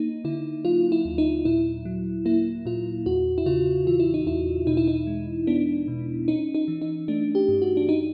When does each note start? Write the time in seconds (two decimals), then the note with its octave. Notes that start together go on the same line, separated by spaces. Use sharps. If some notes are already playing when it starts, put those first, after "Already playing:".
Already playing: A#3 D#4
0.24 D3 E4
0.65 F#3 F4
0.92 E4
1.05 D#2
1.18 D#4
1.45 A#2 E4
1.85 F#3
2.25 A#3 E4
2.65 A#2 F4
3.06 E2 F#4
3.38 E4
3.46 C#3 F4
3.87 E3 F4
4.00 E4
4.14 D#4
4.26 E2 E4
4.67 B2 D#4
4.77 E4
4.87 D#4
5.07 G#3
5.47 B3 D4
5.88 B2
6.28 C#4 D#4
6.55 D#4
6.68 E3
6.82 D#4
7.08 A3 D4
7.35 G4
7.48 G2
7.62 F#4
7.77 D4
7.89 D#4